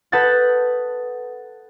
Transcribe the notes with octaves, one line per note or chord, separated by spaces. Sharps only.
A4 B4 F#5 D#6 G6 A6